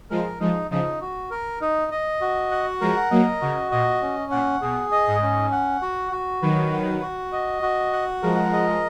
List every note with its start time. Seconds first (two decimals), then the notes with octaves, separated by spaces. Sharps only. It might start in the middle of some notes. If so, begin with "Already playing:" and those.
0.10 F3 G#3 A#4
0.40 F3 G#3 D#4
0.71 C#3 F3 D#4
1.01 F#4
1.31 A#4
1.61 D#4
1.91 D#5
2.21 F#4
2.51 F#5
2.81 F3 G#3 A#4
3.11 F#3 A#3 D#5
3.41 C#3 F#4
3.71 A#2 D#5
4.02 C#4
4.31 A#2 F#5
4.61 B2 G#4
4.92 D#5
5.07 G#2
5.22 C#4
5.52 F#5
5.82 F#4
6.12 F#4
6.42 D#3 F#3 B4
6.72 F#5
7.02 F#4
7.32 D#5
7.62 F#4
7.93 F#5
8.22 F3 G#3 A#4
8.53 D#5